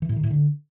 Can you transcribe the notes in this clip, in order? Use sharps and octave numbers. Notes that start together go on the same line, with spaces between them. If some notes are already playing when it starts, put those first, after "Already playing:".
E3
A2
D#3
A2
D3